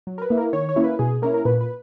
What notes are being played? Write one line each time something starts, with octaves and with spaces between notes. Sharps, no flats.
F#3
A#4
B4
A#3 E4
A#4
D#3 C#5
C#5
A#3 C#4 E4
B4
B2 G#4
A#3 C#4 E4 A#4
A#4
A#2 B4
B4